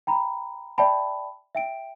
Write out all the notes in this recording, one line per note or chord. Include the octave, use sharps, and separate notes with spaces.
G5 A#5 B5
D5 E5 G5 A5 B5
E5 G5 D7